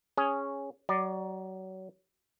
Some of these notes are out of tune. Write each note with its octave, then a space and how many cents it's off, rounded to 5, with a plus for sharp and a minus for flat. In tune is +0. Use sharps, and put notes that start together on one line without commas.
C#4 +0 G#4 +0
F#3 +30 D5 +10